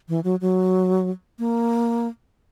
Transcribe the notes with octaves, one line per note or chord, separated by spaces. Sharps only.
E3
F#3
F#3
A#3